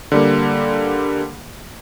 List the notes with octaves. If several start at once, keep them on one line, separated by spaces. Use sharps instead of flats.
D3 G3 A#3